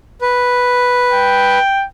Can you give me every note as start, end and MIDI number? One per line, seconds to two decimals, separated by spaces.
0.22 1.58 71
1.12 1.85 79